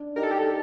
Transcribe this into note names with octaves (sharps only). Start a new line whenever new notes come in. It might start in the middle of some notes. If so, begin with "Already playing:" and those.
Already playing: D4
D#4 G4 A#4
A4
G4
A4